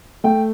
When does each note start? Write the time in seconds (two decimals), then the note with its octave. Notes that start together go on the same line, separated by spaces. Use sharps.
0.24 A3 G5